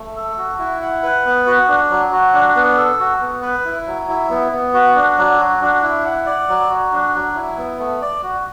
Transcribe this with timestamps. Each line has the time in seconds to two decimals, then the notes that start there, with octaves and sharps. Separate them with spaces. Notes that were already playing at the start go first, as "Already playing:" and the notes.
Already playing: A3
0.16 A4
0.37 F#4
0.59 E4
0.81 F#5
1.03 B4
1.25 B3
1.46 F#4
1.68 D4
1.90 F#3
2.12 F#4
2.34 D4
2.55 B3
2.77 A4
3.00 F#4
3.21 B3
3.42 B4
3.65 E4
3.87 F#3
4.09 E4
4.30 B3
4.52 B3
4.74 F#4
4.95 D4
5.17 F#3
5.39 F#4
5.61 D4
5.83 E4
6.05 F#5
6.26 D5
6.49 F#3
6.69 F#4
6.92 D4
7.14 F#3
7.35 E4
7.57 B3
7.80 A3
8.01 D5
8.23 F#4